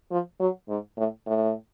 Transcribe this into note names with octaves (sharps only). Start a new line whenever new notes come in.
F3
F#3
G#2
A2
A2